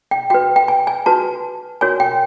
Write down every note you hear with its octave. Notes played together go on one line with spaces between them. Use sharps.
G5
F#4 B4 G5
G5
G#5
G#5
F#4 B4 A5
F#4 A#4 C#5 G#5
G5